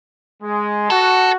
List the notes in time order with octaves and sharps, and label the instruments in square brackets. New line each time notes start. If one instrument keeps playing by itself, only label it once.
[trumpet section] G#3
[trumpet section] F#4 [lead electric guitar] A4